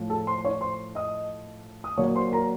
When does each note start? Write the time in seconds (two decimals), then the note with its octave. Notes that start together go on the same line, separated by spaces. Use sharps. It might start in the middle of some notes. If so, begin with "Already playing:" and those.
Already playing: A2 F3
0.10 A4 A5
0.27 C5 C6
0.45 C#5 C#6
0.61 C5 C6
0.95 D#5 D#6
1.84 D#6
1.97 A#2 F#3 A#3 C#5 C#6
2.15 C5 C6
2.32 A#4 A#5